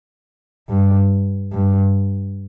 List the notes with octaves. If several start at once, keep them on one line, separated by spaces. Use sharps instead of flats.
G2
G2